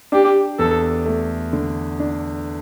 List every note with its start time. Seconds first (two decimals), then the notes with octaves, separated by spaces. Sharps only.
0.12 D4 G4
0.59 E2 A4
1.06 A3
1.53 D3
1.99 D4